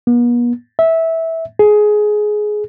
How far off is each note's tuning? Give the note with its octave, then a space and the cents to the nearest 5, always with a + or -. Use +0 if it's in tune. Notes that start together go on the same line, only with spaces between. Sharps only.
B3 -45
E5 -15
G#4 +15